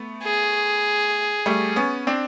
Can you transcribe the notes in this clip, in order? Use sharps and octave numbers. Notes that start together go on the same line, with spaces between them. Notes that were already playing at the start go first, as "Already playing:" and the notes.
Already playing: A3 B3
G#4
G3 A3
B3 C#4
C4 D4